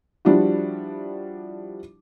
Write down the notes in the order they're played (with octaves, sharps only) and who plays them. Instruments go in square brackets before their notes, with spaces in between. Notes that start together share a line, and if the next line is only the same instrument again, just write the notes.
[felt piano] F3 G3 D4 E4 F#4